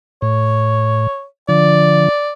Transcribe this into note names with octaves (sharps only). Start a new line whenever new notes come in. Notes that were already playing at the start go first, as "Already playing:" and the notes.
A2 C#5
D3 F3 D5